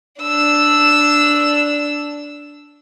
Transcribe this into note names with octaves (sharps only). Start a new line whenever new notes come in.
D4 E6